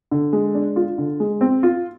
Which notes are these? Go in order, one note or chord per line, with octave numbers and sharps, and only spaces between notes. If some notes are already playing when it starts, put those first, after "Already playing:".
D3
G#3
D4
F4
D3
G#3
C4
F4